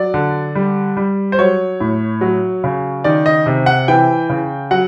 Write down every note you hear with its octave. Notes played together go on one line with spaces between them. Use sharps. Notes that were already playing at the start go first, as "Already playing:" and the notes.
Already playing: F#3 D5
D3
G3
G3
C5
F#3 C#5
A2
F#3
C#3
D#3 D5
D#5
C3
F#5
E3 G5
C#3
F#3 F#5